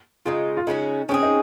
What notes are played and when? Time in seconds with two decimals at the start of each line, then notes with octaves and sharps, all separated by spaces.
0.25 C#3 G#3 D#4 F4
0.57 F4
0.67 C#3 G#3 C#4 D#4 F#4
1.09 G#3 C4 C#4 F4 G#4
1.23 D#4